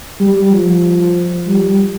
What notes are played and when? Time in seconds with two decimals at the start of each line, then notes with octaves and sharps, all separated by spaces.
0.20 G3
0.52 F3
1.48 G3